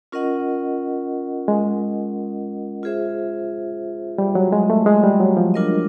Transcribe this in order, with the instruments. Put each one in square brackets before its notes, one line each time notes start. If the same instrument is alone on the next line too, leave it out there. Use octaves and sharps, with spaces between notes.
[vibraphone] C#4 F4 A#4 D#5 F#5
[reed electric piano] G#3
[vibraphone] F4 G#4 C5 E5
[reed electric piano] G3
F#3
G#3
A3
G#3
G3
F#3
F3
[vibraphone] D4 F4 A#4 D#5